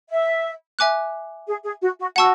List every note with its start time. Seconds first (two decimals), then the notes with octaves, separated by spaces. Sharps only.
0.10 E5
0.79 E5 G#5 D6 F#6
1.47 G#4
1.65 G#4
1.81 F#4
1.99 F#4
2.16 F#4 F#5 A5 C#6 E6